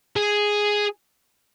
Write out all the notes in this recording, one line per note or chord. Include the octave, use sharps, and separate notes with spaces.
G#4